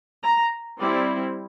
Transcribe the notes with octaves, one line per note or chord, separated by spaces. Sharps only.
A#5
G3 C4 E4 D5